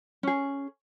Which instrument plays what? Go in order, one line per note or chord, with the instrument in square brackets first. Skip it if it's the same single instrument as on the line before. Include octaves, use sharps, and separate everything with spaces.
[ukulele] C#4 G#4